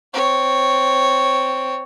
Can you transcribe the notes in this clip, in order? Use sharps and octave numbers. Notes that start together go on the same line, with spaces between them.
C4 C#5